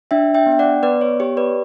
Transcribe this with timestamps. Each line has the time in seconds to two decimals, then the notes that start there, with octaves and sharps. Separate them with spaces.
0.11 D4 E5 G5
0.34 E5 G5
0.46 B3
0.52 G5
0.59 D5 F#5
0.83 B3 B4 D5
1.01 C#5
1.20 G4 C#5
1.37 B4 D5